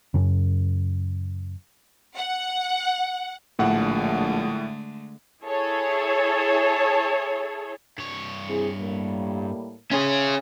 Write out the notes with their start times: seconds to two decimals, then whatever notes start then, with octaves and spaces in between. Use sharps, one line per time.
0.14 F#2 C#3
2.15 F#5
3.59 A#1 A2 D3 G#3 A3 F#5
5.43 E4 G#4 A4 C#5
7.98 G2 C#5
8.48 C4 E4 G#4
8.78 A2 G3 A#3
9.91 C#4 G#4 E5 C6